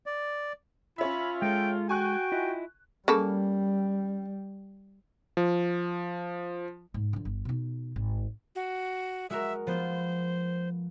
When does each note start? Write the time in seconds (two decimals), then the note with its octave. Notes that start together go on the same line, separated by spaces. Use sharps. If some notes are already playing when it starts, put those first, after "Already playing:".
0.06 D5
0.98 C#4 F4 E5 B5
1.42 G#3 A4 G5
1.89 F#4 G5 G#5 C#6 F#6
2.32 E4 F4 D#5
3.08 C#3 G3 A#3 A4
5.37 F3
6.94 G#2
7.13 D3 F3
7.25 G1
7.45 B2 D#4
7.96 G#1
8.55 F#4
9.30 G#3 F#4 A#4 E5
9.67 F3 B3 F4 C5